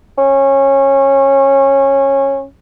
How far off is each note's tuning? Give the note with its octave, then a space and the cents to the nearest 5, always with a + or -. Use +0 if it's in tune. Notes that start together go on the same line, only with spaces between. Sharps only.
C#4 -20